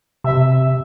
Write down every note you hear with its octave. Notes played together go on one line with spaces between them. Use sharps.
C3 E5